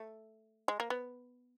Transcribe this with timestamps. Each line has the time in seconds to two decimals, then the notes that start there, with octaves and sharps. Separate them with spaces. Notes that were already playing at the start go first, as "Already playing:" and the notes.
Already playing: A3
0.68 G#3
0.80 A#3
0.90 B3